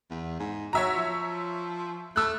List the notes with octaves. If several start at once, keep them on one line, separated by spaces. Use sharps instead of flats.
E2
G#2
F#3 C#5 E5 A#5
F3
A3 E6 F#6